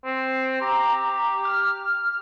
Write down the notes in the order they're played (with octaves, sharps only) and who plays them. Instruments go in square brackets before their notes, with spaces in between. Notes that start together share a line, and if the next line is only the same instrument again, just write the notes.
[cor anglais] C4
[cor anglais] G4 [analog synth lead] A#5
[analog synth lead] F6